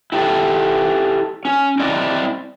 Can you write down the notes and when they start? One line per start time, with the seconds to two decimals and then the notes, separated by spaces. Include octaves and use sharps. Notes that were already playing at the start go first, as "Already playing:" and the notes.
0.12 E4 G4 A4
1.45 C#4
1.80 C4 E4 D5 D#5